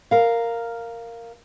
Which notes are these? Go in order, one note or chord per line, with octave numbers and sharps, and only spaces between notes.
A#4 F5